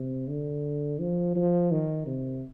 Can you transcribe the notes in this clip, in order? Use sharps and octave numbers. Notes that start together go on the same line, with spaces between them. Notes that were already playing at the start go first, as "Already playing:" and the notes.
Already playing: C3
D3
F3
F3
D#3
C3